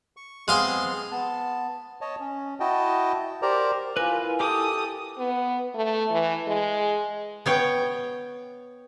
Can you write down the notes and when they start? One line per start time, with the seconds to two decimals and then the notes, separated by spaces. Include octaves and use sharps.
0.17 C#6
0.48 G#3 B3 C4 G#4 F5 C6
1.11 B3 A5
2.01 C#5 D#5 A5
2.20 C#4
2.60 E4 F#4 D#5 G5 A5
3.42 G4 A#4 C5 D5 A#5
3.97 E4 F4 A#4 B4 G#5
4.40 G4 A4 D6 D#6
5.18 B3
5.75 A3
6.11 E3
6.47 G#3
7.46 B3 C#5 G5